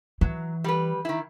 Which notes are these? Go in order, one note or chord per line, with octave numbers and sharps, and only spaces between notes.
E3 F#3
G3 B4
D#3 E4